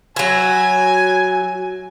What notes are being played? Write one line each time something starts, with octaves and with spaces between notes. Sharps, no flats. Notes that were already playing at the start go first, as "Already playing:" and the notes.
F#3 E4 G#5